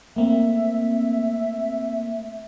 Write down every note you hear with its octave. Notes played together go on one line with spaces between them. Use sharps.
A3 A#3 C4 E5